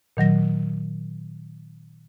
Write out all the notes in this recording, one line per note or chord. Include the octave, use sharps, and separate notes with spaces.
A#2 D#3 F#3 A#6